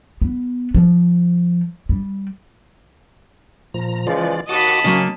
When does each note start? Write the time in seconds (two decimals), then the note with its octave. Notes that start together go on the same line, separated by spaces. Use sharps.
0.22 B3
0.74 F3
1.89 G3
3.74 A#2 F3 A#5
4.07 C#3 E3 F3 G#3 F4 D5
4.49 D#2 F#4 D#5 F#5 A5 B5 D6
4.84 C#3 F#3 A#3 C#4